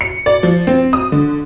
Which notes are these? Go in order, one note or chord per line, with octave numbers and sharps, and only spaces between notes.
C#7
D5
F3
C4
D#6
D3